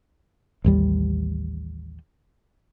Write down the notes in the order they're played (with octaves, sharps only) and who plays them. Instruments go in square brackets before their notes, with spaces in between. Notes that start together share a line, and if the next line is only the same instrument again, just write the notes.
[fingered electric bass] A1 D#2 G3